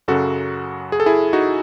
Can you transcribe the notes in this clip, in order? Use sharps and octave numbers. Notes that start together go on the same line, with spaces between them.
F#2 C#3 F#3 F#4 A4
G#4
A4
E4 G#4
D#4 F#4